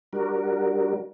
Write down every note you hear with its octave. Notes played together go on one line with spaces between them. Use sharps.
G3 D4 F#4 A#4